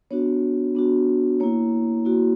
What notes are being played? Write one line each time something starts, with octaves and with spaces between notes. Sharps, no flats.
B3 D4 F#4 C#5
B3 D4 F#4
A#3 E4 C#5
A#3 E4 F#4